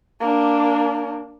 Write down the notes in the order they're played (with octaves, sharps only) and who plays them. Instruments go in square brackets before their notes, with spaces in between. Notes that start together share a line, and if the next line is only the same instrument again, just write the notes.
[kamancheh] A#3 D4